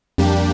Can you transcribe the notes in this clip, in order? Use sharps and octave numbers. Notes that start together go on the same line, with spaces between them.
F2 G3 A#3 D4 G4